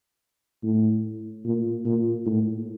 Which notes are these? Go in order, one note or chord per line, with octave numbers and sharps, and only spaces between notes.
A2
A#2
A#2
A2